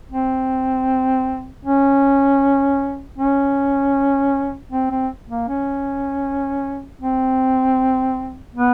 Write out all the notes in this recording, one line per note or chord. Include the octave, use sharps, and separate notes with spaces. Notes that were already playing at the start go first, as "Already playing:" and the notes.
C4
C#4
C#4
C4
C4
A#3
C#4
C4
B3